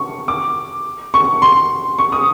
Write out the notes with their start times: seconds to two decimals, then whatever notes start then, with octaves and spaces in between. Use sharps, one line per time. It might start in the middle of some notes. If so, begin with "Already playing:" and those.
Already playing: C#6
0.28 D6
1.14 C#6
1.42 C6
1.99 C#6
2.12 D#6